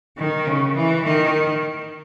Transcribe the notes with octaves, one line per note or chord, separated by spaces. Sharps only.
D#3
C#3
E3
D#3